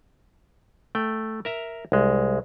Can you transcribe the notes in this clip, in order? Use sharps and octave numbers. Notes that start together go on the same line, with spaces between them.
A3 G5
A#4 E5 A#5
C2 G#3